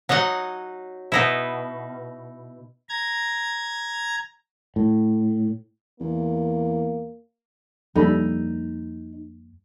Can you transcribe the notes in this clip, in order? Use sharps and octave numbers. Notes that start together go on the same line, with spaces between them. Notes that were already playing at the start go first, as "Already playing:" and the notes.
F#3 D#4 D#5 F#5
B2 D#4 E4
A#5 G#6
A2
E2 A#3
F2 F3 G3 A#3 D#4 A4 B5